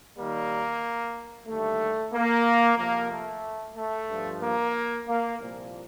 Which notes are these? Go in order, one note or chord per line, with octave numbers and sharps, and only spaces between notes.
D#2 D#3 G3 A#3
D#2 D3 G3 A3
A#3
F2 C3 F3 A#3
A3
A3
G2 F3
A#3
A#3
C2 A#2 F3